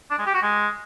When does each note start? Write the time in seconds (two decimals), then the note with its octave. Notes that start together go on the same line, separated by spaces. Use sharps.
0.10 D4
0.18 G#3
0.26 G4
0.34 F#4
0.42 G#3